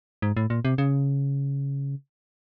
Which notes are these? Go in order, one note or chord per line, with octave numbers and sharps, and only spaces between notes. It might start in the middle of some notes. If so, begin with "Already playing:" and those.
G#2
A2
A#2
C3
C#3